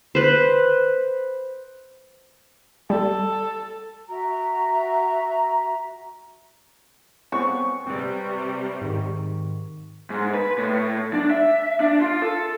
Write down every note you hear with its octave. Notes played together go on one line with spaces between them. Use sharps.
B4 C5
G3 A4
F#4 E5 A#5
B3 C4 C5 C#6
C3 G3 C4 B4 D5
G#2 D#3
G#2
B4
A2
D4
E5
D4
F4
A4